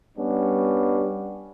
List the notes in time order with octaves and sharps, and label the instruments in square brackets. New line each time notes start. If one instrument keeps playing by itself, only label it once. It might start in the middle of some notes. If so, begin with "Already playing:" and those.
[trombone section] G3 B3 C#4 D4